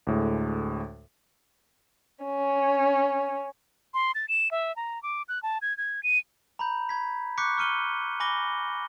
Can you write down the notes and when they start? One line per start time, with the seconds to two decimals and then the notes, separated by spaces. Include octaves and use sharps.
0.07 D2 A2 G#3
2.24 C#4
3.94 C6
4.15 A6
4.29 E7
4.51 E5
4.76 A#5
5.03 D6
5.29 F#6
5.43 A5
5.62 G#6
5.78 G#6
6.03 D#7
6.59 A#5 B5 G6
6.89 B5 G#6 B6
7.38 C#6 D6 F#6 G6 B6 C#7
7.57 C#6 F6 C#7 D#7 G7
8.20 G#5 B5 D6 A#6 G7